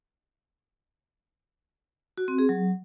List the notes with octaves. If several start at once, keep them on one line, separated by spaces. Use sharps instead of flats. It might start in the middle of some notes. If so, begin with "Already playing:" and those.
F#4
C4
G#4
F#3